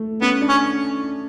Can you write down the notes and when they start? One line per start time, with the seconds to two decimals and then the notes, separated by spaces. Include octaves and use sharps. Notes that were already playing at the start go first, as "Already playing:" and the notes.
Already playing: A3
0.21 B3 C#4
0.41 D4
0.48 C#4